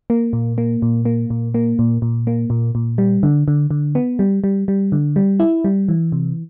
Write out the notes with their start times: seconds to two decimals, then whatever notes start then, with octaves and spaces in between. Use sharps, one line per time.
0.10 A#3
0.33 A#2
0.58 A#3
0.82 A#2
1.05 A#3
1.30 A#2
1.54 A#3
1.79 A#2
2.02 A#2
2.27 A#3
2.50 A#2
2.75 A#2
2.98 G3
3.23 D3
3.48 D3
3.71 D3
3.95 B3
4.19 G3
4.44 G3
4.68 G3
4.92 D3
5.16 G3
5.40 E4
5.64 G3
5.89 E3
6.12 C3